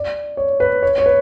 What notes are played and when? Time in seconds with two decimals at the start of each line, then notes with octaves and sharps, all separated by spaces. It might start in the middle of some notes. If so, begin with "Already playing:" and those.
Already playing: D5
0.37 C#5
0.60 B4
0.83 C#5
0.98 C#5
1.06 B4